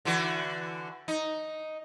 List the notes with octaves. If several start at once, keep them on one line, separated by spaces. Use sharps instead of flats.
D3 E3 F#4
D#4